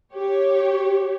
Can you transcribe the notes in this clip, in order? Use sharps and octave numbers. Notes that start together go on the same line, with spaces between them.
G4 C#5